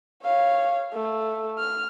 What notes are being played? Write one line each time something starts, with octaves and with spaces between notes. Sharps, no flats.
C#5 F5
A3
F6